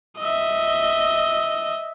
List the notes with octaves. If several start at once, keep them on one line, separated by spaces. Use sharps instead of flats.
D#5 E5